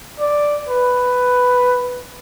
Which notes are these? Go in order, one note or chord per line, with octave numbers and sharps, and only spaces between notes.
D5
B4